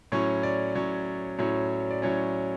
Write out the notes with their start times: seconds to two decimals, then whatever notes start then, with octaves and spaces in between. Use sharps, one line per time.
0.12 A2 F#3 C#4 C#5
0.43 D5
0.75 A2 F#3 C#4 C#5
1.39 A2 F#3 C#4 C#5
1.91 D5
2.02 A2 F#3 C#4 C#5